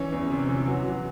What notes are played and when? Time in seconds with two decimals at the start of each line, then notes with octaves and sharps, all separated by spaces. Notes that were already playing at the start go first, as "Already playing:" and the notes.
Already playing: E3 C#4
0.12 E2
0.30 C3
0.49 E3
0.67 F#3
0.85 F#3